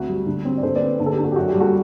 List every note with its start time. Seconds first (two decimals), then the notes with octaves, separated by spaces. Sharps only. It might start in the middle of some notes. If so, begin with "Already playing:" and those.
Already playing: D2 C4 F#4
0.08 G3
0.26 D3
0.45 C4
0.57 D5
0.63 D3 A4 C5
0.75 B4 D5
0.81 C4
1.00 D3
1.06 A4
1.12 G4
1.18 D4
1.24 F#4
1.32 G4
1.36 F#2 F#4
1.48 G4
1.55 G3
1.60 F#4 A4